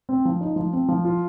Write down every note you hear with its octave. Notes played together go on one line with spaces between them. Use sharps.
C4
F3
D#4
F3
C4
F3
F4